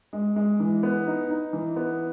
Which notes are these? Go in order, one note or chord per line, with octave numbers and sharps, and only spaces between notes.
G#3
G#3
E3
B3
D#4
D#4
E3
B3